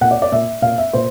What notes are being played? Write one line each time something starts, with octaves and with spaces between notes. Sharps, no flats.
A#2 F#5
D5
D5
A#2 E5
A#2 F5
E5
A#2 C5